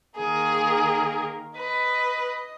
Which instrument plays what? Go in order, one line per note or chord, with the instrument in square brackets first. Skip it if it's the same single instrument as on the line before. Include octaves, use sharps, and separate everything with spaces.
[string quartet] D#3 A#3 A#4 [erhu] G#4
[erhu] B4 [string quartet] D#5